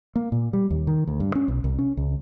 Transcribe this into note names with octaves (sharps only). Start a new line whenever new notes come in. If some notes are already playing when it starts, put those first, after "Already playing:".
A#3
A#2
G3
D#2
D#3
D2
G2
C#4
B1
C2
C#4
C#2